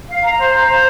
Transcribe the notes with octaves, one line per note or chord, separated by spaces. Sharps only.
F5
A#5
C5
A#5
C5